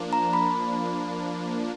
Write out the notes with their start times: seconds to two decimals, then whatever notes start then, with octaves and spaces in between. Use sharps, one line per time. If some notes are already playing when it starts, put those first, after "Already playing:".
Already playing: F3 A#3 D4
0.13 A#5
0.33 B5